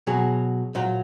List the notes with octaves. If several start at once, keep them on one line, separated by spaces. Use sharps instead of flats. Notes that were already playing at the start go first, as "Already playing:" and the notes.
B2 F#3 G#4
A#2 F#3